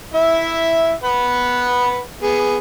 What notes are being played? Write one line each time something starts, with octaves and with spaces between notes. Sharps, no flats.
E4 E5
B4 F#5
B3 G#4